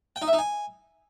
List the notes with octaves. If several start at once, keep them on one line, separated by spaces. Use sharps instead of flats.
G5
D#4
E5
D#4
G#5